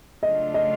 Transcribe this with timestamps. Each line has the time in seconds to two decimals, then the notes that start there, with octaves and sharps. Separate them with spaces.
0.23 C#3 F#3 A3 D4 F4 D#5
0.54 D#5